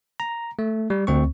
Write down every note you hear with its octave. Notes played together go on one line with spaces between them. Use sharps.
A#5
A3
G3
D2 C4 C#6